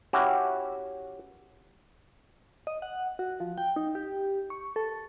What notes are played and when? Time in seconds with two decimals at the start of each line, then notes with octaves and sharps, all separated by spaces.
0.13 C#4 E4 F#4 G4
2.67 D#5
2.82 F#5
3.19 F#4
3.40 F3
3.58 G5
3.76 D#4
3.95 G4
4.50 C#6
4.76 A4